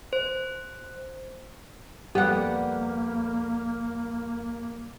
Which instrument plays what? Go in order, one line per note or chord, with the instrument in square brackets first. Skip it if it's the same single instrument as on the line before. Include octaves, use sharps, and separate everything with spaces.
[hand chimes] C5
[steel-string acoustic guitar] F2 G3 [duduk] A#3 [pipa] B3 F#5 [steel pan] G4